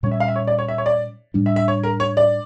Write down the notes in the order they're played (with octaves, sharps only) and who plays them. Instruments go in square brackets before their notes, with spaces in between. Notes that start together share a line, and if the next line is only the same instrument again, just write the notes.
[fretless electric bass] A#2 G3 C#4 [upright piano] C#5
[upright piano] E5
F5
E5
C#5
D5
C#5
E5
C#5
D5
[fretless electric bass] A2 G3 D4
[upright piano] E5
E5
C#5
A#4
C#5
D5